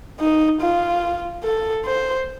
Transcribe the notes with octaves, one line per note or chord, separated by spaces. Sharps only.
D#4
F4
A4
C5